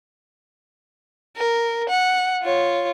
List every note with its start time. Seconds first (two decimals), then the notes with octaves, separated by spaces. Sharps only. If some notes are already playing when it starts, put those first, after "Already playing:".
1.37 A#4
1.90 F#5
2.44 F4 C#5